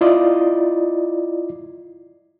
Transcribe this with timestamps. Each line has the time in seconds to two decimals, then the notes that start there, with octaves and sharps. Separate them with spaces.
0.01 E4 F4 D5 D#5